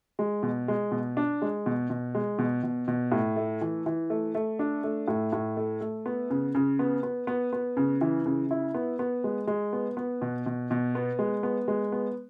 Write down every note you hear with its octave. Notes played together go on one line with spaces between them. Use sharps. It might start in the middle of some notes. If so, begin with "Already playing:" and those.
G#3
B2
G#3
B2
D4
G#3
B2
B2
G#3
B2
B2
B2
A2
A3
E3
E3
A3
A3
D4
A3
A2
A2
A3
A3
B3
C#3
C#3
B3
B3
B3
B3
C#3
E3
C#3
E4
B3
B3
G#3
G#3
B3
B3
B2
B2
B2
B3
G#3
B3
G#3
B3